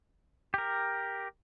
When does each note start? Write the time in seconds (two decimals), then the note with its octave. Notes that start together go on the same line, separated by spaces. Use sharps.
0.54 G4 A#4